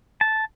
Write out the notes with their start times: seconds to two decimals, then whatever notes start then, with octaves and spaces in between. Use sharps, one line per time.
0.21 A5